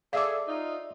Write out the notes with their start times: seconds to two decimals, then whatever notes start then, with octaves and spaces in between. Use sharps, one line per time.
0.13 G#4 A4 D5 E5 F5 D6 E6
0.46 D#4 F4